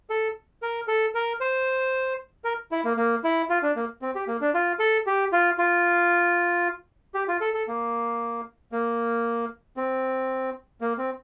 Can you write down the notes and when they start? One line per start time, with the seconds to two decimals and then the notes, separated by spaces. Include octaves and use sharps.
0.10 A4
0.62 A#4
0.88 A4
1.15 A#4
1.40 C5
2.44 A#4
2.72 E4
2.85 A#3
2.97 A#3
3.24 E4
3.50 F4
3.63 D4
3.76 A#3
4.02 C4
4.15 G4
4.28 A#3
4.41 D4
4.54 F4
4.79 A4
5.07 G4
5.32 F4
5.58 F4
7.14 G4
7.28 F4
7.41 A4
7.54 A4
7.68 A#3
8.72 A#3
9.77 C4
10.81 A#3
10.98 C4